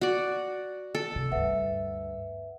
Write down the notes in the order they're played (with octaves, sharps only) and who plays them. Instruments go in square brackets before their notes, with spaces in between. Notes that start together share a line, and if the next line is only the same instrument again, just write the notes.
[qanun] F#4 D5
A4
[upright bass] C3
[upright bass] D2 G2 [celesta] B4 E5 F#5